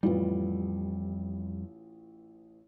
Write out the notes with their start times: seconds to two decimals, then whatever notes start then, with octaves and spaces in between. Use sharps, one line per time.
0.03 A1 F2 G3 F4 B4